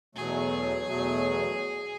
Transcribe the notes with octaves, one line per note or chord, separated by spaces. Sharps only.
E2 B2 F#3 A3 G#4
E2 B2 F#3 A3